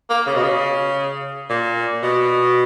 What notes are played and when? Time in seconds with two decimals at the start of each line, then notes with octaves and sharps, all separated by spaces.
0.09 A#3
0.26 C#3
0.35 B2
0.43 C#3
1.49 A#2
2.02 B2